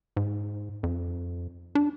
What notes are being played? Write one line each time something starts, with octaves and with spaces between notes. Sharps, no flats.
G#2
F2
D4